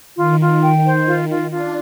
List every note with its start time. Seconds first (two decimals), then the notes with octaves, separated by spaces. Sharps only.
0.16 D#3 F4
0.39 F4
0.62 G5
0.84 C5
1.07 F4
1.29 F4
1.51 D4 F4